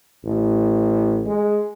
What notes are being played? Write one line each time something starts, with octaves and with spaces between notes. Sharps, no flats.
A1
G#3